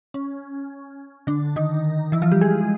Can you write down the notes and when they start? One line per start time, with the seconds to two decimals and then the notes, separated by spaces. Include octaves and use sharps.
0.14 C#4
1.27 D3 D4
1.56 D#3 D#4
2.12 E3 E4
2.22 F3 F4
2.31 G3 G4
2.41 G#3 G#4